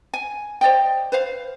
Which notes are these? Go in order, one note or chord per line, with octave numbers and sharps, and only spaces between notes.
G#5
C5 D5 D#5 G5
B4 C5 F5